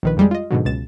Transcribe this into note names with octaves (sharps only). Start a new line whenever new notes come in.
A#1 D#3 B4
F2 G3 G#3
F4 D#5
G#2 B2 D3 F#3
C#2 B2 A6 E7